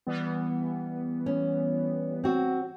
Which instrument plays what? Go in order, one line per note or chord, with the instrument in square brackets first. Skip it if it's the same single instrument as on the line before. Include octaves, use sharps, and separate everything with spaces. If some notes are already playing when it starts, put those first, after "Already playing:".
[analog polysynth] E3 G3 B3
[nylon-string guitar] C#4
C4 F#4